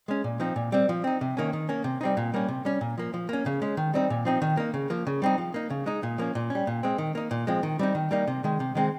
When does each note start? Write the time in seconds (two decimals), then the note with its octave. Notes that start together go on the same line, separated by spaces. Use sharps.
0.08 G#3 C#4
0.24 A#2
0.40 F3 C4 D#4
0.56 A#2
0.72 G3 C4
0.89 F3
1.04 C4 D#4
1.21 C3
1.37 D#3 A#3 C#4
1.53 D#3
1.69 A#3 C#4
1.84 C3
2.01 G3 C4 D#4
2.17 A#2
2.34 G3 A#3 C#4
2.48 C3
2.65 G3 C#4
2.81 A#2
2.98 F3 A#3
3.14 F3
3.29 A#3 C#4
3.46 C#3
3.62 G#3 C#4
3.77 D#3
3.94 G3 C4 D#4
4.10 A#2
4.25 F3 C4 D#4
4.42 D#3
4.57 A#3 D#4
4.74 C#3
4.90 F3 A#3
5.07 C#3
5.22 G3 C4 D#4
5.38 F3
5.54 A#3 D#4
5.70 C#3
5.86 G#3 D#4
6.03 A#2
6.18 F3 A#3 C#4
6.35 A#2
6.50 G3 C#4
6.67 A#2
6.83 G#3 C4
6.98 D#3
7.15 A#3 D#4
7.31 A#2
7.47 F3 G#3 C4
7.63 D#3
7.79 G3 C4 D#4
7.95 D#3
8.11 G3 A#3 D#4
8.27 C3
8.44 D#3 G#3
8.60 C3
8.75 D#3 G#3 C4 D#4